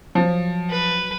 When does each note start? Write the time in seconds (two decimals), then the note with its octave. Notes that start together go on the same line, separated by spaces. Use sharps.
0.15 F3 F#3
0.70 B4